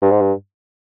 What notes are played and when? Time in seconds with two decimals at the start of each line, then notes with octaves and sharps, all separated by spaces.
0.02 G2
0.11 G#2
0.20 G2